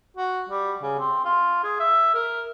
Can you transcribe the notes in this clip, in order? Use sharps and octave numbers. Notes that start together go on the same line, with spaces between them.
F#4
G3
C#3
C4
F4
G#4
E5
A#4